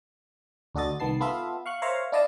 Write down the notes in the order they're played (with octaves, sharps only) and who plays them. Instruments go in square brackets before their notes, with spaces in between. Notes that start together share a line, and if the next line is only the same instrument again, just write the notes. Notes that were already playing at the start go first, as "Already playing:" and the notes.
[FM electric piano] D2 D4 F#4 A4 D#5 A6
C2 D#3 B3 A5 C7
B3 F4 A4 E5 F5
F5 C#6 F#6
A#4 C5 C#5 E5 F5 A#5
D4 E4 D5 D#5 F5 A5